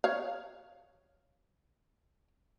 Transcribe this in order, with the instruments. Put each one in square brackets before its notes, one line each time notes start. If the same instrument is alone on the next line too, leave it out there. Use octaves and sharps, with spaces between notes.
[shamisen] C#5 F5